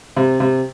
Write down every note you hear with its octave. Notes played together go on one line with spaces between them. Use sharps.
C3
C3